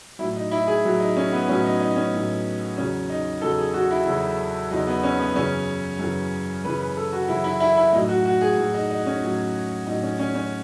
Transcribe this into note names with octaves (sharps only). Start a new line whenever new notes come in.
A2 F#3 E4
D#4
E4
G#4
A2 F#3
D#4
C#4
B3
A2 F#3 C#4
D#4
D#4
C#4
A2 F#3
E2 C#3 F#3 C#4
D#4
E2 C#3 F#3 A4
G#4
F#4
E4
E2 C#3 F#3
E2 C#3 F#3 D#4
B3
C#4
B3
F#2 C#3 E3 C#4
F#2 C#3 E3
F#2 C#3 E3 B4
B4
A4
F#4
F#2 C#3 E3 E4
E4
E4
E4
A2 F#3 D#4
F#4
F#4
G#4
A2 F#3
D#4
D#4
C#4
A2 F#3
A2 F#3 D#4
C#4
C#4
C#4